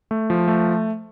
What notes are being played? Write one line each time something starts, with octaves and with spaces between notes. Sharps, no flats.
A3
F3
A3